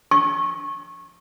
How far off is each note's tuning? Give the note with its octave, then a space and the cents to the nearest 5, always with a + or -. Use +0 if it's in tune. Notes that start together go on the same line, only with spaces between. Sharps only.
C#6 -25